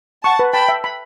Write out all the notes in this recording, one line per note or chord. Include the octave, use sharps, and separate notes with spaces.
F#5 A5 C#6
B4
G5 A5 B5
E5
B5